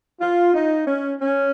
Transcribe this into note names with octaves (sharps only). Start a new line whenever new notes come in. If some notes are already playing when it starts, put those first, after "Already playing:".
F4
D#4
C#4
C#4